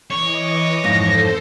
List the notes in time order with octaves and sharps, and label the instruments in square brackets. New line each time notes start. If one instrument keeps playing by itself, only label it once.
[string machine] E3 D#5 D6 [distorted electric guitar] C#5
[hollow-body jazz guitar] F2 G#2 [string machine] A4 C5 [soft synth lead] A#6